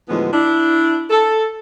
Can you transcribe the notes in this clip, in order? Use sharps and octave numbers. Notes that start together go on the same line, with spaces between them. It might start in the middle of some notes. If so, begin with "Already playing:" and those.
D2 A2 E3 F3 G#3 B3
D4 E4
A4